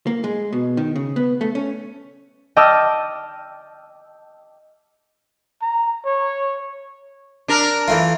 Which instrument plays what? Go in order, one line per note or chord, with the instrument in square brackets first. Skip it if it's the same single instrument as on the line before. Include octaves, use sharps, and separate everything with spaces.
[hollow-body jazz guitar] A#3
G#3
B2
D#3
C#3
B3
A3
C#4
[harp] D#5 G5 A5 D6 E6 F6
[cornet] A#5
C#5
[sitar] D4 A#4
[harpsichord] E3 A3 F4